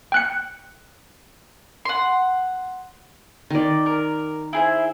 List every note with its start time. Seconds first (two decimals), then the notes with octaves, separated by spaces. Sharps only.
0.12 G5 F#6 C#7
1.85 F#5 C6
3.50 D#3 D5
3.86 A#4
4.53 E4 G#4 C5